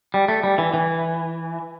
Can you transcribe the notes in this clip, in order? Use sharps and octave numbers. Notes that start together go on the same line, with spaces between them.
G3
A3
G3
E3
E3